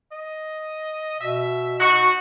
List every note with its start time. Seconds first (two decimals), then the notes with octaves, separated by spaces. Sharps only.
0.12 D#5
1.21 B2 E5
1.80 D#4 F#4